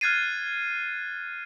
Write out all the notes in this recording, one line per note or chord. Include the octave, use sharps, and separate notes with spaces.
F6 F#6 G#6 A6 C7 D#7